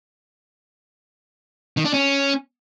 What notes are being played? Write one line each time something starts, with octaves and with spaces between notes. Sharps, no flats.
D#3
D4
C#4